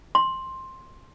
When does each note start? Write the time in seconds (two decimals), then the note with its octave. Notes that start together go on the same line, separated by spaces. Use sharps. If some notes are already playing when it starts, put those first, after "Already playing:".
0.15 C6